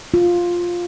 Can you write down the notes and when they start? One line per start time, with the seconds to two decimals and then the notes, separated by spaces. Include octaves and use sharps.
0.14 F4